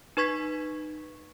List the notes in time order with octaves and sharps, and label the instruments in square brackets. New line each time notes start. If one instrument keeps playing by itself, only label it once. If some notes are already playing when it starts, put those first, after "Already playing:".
[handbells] D#4 B4 C#6 G#6 B6